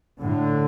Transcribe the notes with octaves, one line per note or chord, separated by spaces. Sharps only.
A2 D3